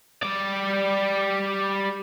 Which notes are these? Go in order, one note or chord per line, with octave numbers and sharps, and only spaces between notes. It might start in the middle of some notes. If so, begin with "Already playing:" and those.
G3 D5